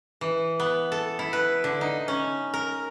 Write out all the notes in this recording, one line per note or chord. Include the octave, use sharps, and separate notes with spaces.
E3
B3
A4
E4
B4
D3
D#4
C#4
A#4